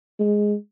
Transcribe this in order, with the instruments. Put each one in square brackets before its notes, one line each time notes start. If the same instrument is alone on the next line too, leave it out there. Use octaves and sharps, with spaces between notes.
[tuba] G#3